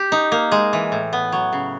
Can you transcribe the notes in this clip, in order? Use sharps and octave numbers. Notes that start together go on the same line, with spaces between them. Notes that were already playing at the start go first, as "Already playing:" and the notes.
Already playing: G4
D#4
A#3
G#3
E3
A2
B3
F#3
C#3